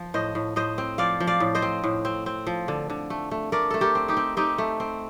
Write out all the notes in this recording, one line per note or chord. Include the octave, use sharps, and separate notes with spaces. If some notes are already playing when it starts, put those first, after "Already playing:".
Already playing: F3
A2 C5 D#5
A2
A2 C5 D#5
C4
F3 D5 F5
F3
D5 F5
A2
C5 D#5
C4
A2
C4
C4
F3
D3
D3
A3
A3
A3 A#4 D5
A3 A4
G4 A#4
C4
D#4 G4
C4
C4 D#4 G4
A3
C4